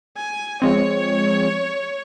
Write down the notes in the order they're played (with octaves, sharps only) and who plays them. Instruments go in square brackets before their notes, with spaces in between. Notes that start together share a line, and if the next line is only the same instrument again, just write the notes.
[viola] G#5
[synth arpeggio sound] F3 G#3 C4 [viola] C#5